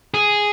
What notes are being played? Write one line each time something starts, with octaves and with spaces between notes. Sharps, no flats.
G#4